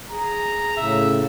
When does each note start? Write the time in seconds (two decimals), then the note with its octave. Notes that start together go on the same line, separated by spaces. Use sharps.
0.11 G#4 A#5
0.77 A2 C#3 E5